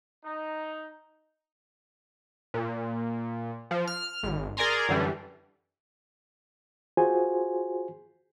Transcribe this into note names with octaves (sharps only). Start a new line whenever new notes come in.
D#4
A#2
F3
F6
G#1
G#4 A#4 D5 G#5 A#5 C6
F#2 D3 E3 G3
F4 F#4 G#4 C5 G#5